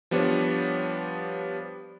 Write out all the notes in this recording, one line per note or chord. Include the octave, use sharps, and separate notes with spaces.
F3 G3 B3 D4 C#5